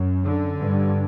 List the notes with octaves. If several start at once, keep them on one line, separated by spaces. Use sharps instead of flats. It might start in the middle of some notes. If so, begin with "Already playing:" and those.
Already playing: F#2
D3
G2